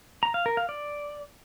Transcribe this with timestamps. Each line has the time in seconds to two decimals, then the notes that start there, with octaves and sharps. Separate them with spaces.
0.23 A#5
0.34 F5
0.46 A#4
0.57 F5
0.69 D5